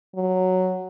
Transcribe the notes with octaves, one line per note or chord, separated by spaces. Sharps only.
F#3